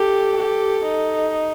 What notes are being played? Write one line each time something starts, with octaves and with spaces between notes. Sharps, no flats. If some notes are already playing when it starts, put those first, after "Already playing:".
Already playing: G4 A4
G4
D#4